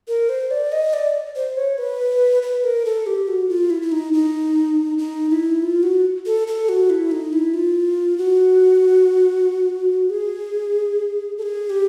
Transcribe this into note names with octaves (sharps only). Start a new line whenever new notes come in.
A#4
C5
D5
D#5
D5
C5
C#5
B4
B4
A#4
A4
G4
F#4
F4
E4
E4
D#4
D#4
D#4
E4
F4
F#4
A4
A4
F#4
E4
D#4
E4
F4
F#4
G#4
A4
G#4
G4